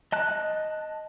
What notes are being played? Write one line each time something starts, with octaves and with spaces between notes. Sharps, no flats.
D#5 A5 F#6